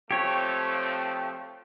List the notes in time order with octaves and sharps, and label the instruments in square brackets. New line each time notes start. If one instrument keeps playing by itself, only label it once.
[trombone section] F3 A3 C4 [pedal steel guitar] G4 C#5